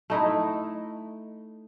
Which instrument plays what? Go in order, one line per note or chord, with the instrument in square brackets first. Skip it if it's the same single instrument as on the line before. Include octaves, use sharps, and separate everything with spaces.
[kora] A3 D#4 E4